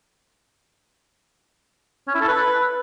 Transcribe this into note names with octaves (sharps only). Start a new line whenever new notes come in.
C#4
E4
A4
B4